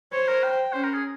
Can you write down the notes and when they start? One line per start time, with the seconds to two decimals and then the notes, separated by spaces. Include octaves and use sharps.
0.13 C5 C#5
0.28 A#4
0.44 G5
0.73 C#4 C5
0.84 A#4
0.94 G#4